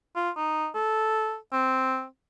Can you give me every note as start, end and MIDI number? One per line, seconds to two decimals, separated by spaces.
0.16 0.30 65
0.36 0.67 63
0.75 1.36 69
1.52 2.05 60